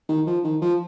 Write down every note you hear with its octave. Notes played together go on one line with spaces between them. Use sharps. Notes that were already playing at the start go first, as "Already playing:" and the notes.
D#3
F3
D#3
F3